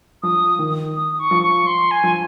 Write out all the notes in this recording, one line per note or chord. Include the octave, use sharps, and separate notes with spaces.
F3 D#6
D#3
D#6
C#6
F3
C#6
C6
G#5
F3